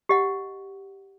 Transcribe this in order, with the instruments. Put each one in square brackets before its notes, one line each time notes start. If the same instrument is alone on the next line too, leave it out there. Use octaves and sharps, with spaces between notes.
[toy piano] G4 D#5 F#5